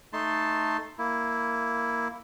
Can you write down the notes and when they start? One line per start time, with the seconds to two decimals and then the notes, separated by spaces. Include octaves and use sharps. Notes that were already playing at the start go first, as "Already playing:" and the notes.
0.13 A3 D#4 A5 C6
0.98 A#3 E4